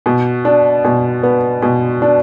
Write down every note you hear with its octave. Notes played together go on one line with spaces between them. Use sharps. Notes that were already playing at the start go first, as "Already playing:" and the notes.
B2
D4
B2
B3
B2
D4